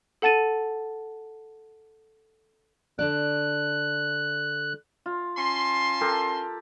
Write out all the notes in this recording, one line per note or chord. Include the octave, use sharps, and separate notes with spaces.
A4 F#5 A5 A6 D#7
D3 D4 D5 F#6
F4
C#4 A5 C6
G4 A4 A#4